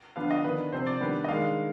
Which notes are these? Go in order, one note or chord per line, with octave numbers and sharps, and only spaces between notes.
D3 F3 B3 D4 F5
D#5
D#3 B3 D4 B4
C3 F3 C4 C5
D5
D#3 G3 B3 D4
D#5
D#3 G#3 D4 F5